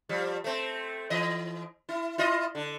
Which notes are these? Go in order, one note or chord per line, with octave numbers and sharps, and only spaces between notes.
F3 G3
A3 C4
E3 D#5
E4
E4 F4 D#5
D3